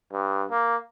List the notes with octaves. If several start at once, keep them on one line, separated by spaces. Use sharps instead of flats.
G2
A#3